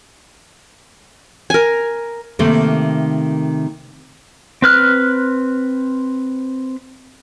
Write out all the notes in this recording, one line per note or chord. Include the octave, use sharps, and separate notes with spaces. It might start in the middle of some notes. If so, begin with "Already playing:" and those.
A#4 G#5
C3 D#3 A3 A#3
C4 B4 F6 F#6